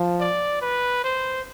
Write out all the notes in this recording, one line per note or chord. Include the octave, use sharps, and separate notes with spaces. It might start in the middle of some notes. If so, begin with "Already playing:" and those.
Already playing: F3
D5
B4
C5